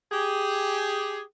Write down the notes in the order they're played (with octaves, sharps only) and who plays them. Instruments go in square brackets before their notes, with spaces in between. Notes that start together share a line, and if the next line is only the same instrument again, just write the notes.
[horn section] G4 G#4